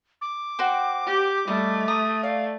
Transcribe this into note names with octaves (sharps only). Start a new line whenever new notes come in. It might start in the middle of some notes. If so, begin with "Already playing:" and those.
D6
F#4 C5 G5
G4
G3 A3 D#5
A#5 D#6
D5 F5